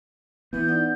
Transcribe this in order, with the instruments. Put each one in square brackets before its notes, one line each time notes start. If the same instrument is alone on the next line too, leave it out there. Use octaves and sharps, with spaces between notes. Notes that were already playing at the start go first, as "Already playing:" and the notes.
[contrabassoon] E3 [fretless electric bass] B3 [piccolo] G6
[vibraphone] D#4 D5 F#5